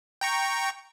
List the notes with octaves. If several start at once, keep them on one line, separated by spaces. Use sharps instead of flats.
G5 A#5 C#6